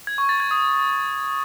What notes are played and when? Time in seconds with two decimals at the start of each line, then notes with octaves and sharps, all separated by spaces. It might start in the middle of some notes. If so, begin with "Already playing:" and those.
0.07 G#6
0.18 C#6
0.29 A6
0.40 G#6
0.51 D#6